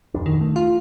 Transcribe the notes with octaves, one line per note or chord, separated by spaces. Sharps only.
D#1 F2 D4
D#3
A3
F4